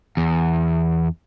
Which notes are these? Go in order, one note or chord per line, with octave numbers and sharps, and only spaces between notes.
E2